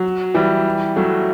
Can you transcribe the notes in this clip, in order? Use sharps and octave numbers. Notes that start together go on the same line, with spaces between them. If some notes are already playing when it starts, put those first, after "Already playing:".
Already playing: F#3
E3 G3
F#3 A3